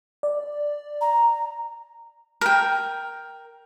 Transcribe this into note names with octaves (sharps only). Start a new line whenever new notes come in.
D5
A#5
A#4 G5